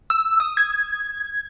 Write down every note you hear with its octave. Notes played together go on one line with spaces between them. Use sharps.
E6
D#6
G#6